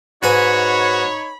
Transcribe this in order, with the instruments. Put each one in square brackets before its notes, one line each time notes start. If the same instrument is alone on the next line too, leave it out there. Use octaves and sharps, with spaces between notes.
[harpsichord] G#2 B4 G#5 [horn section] D#4 C#5 [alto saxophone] F#4 [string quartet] B5